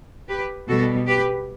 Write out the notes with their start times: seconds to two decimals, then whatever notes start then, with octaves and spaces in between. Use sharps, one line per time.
0.28 G4 B4
0.68 B2 G3 B3 F#4 A4
1.07 G4 B4